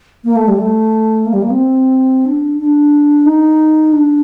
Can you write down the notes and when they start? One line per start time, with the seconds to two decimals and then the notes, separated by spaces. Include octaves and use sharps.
0.24 A#3
0.36 A3
0.48 G3
0.58 A3
1.26 A#3
1.33 G3
1.42 A#3
1.50 C4
2.25 D4
2.59 D4
3.26 D#4
3.93 D4